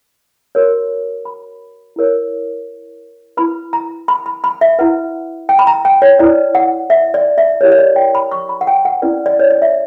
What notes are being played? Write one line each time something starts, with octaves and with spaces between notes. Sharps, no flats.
F#4 A#4 C#5
B5
E4 A#4 C#5
E4 B4 B5
A#5
B5
B5
B5
E5
E4 B4 F#5
G5
B5
A#5
G5
C#5
E4 B4 D5
F#5
E5
D5
E5
E4 G4 A#4 C#5
C#5
D5
G5
B5
C#6
B5
F#5
G5
F#5
C#4 E4 B4 D5
D5
C#5
D5
E5